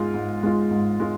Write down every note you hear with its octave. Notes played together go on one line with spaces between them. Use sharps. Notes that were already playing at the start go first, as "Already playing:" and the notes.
Already playing: G#2 G#3 F4
G#2
G#3 F4
G#2
G#3 F4